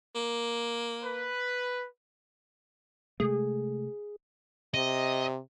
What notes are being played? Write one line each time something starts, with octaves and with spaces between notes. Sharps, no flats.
A#3
B4
C3 G#3 A3 G#4
C3 D#5